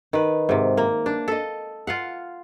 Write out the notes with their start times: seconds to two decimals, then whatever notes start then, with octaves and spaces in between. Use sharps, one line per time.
0.13 D#3 B4
0.49 G#2 C3
0.77 A#3
1.06 D4
1.28 A4 D#5
1.87 F4 F5 F#5